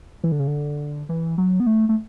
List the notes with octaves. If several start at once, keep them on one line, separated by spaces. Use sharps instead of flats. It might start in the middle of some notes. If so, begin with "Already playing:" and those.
E3
D3
C#3
D3
E3
F#3
B3
A3
A3